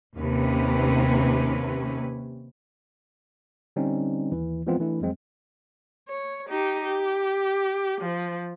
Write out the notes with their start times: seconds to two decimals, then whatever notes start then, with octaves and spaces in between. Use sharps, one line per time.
0.17 D#2 C3 C#4 B4
3.76 D3 G3 C4 C#4 D#4
4.32 D#2 E3
4.66 E3 F3 G#3 B3 C4 F4
4.80 E3 A3 D4 E4
5.01 F2 F#3 G#3 C4
6.09 C#5
6.49 D#4 G4
6.84 G4
8.01 F3